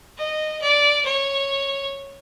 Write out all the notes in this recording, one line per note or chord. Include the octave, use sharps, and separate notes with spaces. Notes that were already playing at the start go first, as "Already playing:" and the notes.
D#5
D5
C#5